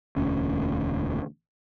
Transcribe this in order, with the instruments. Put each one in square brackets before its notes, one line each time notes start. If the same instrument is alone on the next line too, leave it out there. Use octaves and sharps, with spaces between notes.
[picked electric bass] E1 D2 C#4